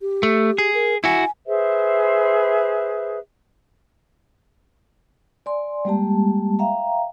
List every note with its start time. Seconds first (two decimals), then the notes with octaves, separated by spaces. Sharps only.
0.01 G4
0.23 A3
0.58 G#4
0.74 A#4
1.04 E4 F#4 G#5
1.47 G#4 B4 C5 E5
5.46 D5 G#5 C6
5.85 G3 G#3 A#3 G4 A5
6.59 E5 F5 G5 A#5